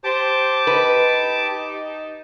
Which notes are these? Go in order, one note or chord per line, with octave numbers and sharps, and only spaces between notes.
G4 C5 A5 D6
D#4 B4